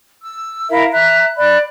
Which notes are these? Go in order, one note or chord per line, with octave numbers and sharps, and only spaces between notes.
E6
E4 A#4 E5 F5
E5 A#5 F#6
D5 B5 F#6